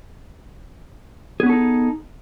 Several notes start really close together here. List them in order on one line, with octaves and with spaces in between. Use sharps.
G#4 B3 C#4 A4 D#4